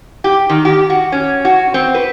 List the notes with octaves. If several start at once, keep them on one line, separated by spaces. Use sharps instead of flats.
G4
D#3
G4
F#4
C#4
F#4
C4
B4